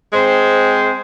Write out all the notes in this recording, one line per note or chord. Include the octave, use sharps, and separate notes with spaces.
G#3 C4 C5